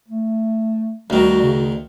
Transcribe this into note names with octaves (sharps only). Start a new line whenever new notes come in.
A3
D2 D#3 G3 F#4
C#3